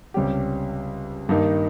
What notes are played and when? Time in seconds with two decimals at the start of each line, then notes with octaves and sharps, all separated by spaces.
0.14 C#2 C3 G3 C#4 G4
1.29 G2 D#3 A#3 D#4